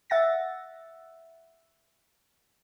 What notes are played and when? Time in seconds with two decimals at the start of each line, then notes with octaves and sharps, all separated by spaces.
0.10 E5 F#5 A6 A#6